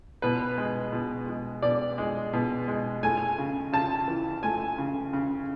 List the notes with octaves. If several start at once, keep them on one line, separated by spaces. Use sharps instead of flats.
B2 B4
G#3
B2
G#3
B2 D5
G#3
B2
G#3
A3 G#5
C#3
C#3 A5
E3
A3 G#5
C#3
C#3